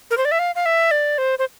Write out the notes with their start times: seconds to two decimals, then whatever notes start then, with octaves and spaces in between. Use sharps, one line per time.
0.11 A#4
0.17 C5
0.25 D5
0.31 E5
0.39 F5
0.55 F5
0.66 E5
0.91 D5
1.18 C5
1.39 C5